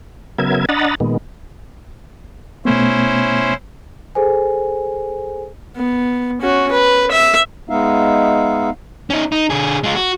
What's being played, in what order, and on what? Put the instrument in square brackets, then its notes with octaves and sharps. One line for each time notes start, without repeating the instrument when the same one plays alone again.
[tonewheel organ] C#3 F#3 B3 A#4 E5 G#6
D4 D#5 F#5 A#5 B5 A6
A#2 D#3 G#3 B3
[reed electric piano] B2 A3 B3 [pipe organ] C#4 E4 C5
[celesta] G#4 A4 C5 G#5
[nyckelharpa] B3
C#4 F#4
B4
E5
[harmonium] G#3 B3 D#4 E5 F5
[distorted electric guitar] C#4 D#4
D#4
D3 G#4
G#3 F4
F#4